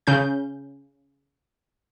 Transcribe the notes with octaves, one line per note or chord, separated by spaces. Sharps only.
C#3 C#4 G6